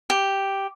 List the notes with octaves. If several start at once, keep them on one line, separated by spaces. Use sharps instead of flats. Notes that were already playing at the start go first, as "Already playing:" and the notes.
G4